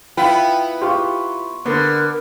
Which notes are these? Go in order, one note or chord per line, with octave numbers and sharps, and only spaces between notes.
B3 E4 F4 G5
F4 G4 C6 C#6
D3 B3 A#4